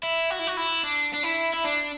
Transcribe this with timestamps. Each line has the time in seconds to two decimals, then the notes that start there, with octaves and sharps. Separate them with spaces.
0.03 E4
0.30 F#4
0.39 E4
0.47 F#4
0.57 E4
0.83 D4
1.13 D4
1.23 E4
1.53 E4
1.64 D4